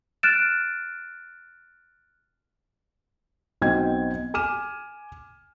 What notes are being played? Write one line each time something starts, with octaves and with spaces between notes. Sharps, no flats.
F6 F#6 A6 D7 E7
B1 B2 C4 G5 G#6
G#5 D6 F6 D#7 E7